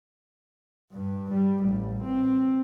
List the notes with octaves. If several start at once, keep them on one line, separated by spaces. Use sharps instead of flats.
G2
G3
A1
C4